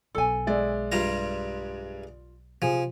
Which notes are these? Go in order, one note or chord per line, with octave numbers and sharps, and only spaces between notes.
B1 E4 A4 G#5
G#3 D5 E5
G2 G3 F4 A#5
C3 F3 G#4